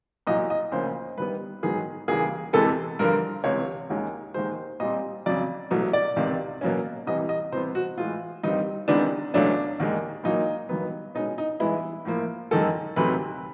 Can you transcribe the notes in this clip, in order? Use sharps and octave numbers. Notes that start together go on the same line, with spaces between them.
C2 A#2 F#3 D#5
D#5
D2 C#3 F3 A#3 C#4 C5
G2 D#3 G3 B3 B4
G#2 D#3 F#3 B3 G#4
D#2 C#3 E3 G3 A#3 G#4
E2 C3 E3 G#3 B3 A4
G2 D3 F3 A#4
C#2 C3 E3 C#5
D#2 D#3 G#3 C#4
D#2 D#3 G#3 C5
A#2 G3 C4 D#5
F2 C#3 F#3 D5
C2 B2 F#3 A3
D5
C#2 C3 D#3
B2 F#3 A#3 C#4
C2 C3 E3 G3 D#5
D#5
C3 E3 G3 B3 C5
F#4
A2 E3 G#3 F4
G2 D#3 G3 C4 D#4
C2 C3 D#3 G#3 B3 D4
C#2 B2 F#3 A3 C#4 D4
D#2 D#3 G#3
A#2 F#3 A#3 D#4
G2 D#3 F#3 B3
B2 G#3 C#4 D#4
D#4
G2 E3 G#3 B3 E4
A2 F3 A#3
F#2 D#3 G#3 A4
D2 C3 D#3 F#3 A3 B4